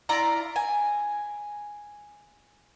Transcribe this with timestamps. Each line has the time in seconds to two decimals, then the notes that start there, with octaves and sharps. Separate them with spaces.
0.09 E4 F4 D5 A#5
0.56 G#5